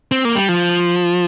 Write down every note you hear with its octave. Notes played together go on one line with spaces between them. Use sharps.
C4
A#3
G3
F3